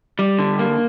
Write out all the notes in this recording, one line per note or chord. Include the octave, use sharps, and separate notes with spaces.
G3
D3
A#3